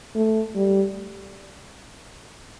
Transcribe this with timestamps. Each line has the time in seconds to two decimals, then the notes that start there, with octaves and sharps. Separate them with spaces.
0.15 A3
0.56 G3